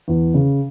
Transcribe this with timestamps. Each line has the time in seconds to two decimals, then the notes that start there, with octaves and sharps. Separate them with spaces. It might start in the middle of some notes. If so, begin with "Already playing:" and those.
0.08 E2
0.34 C#3